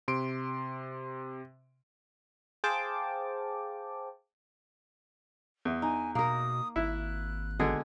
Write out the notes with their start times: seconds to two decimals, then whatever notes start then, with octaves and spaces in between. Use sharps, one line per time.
0.08 C3 C6 D7
2.64 G#4 C5 F5 G5 A5 D6
5.65 E2
5.82 D#4 G#5
6.15 B2 A#3 A#4 D#6
6.76 G#1 E4 F#6
7.60 B2 D3 G#3 G#4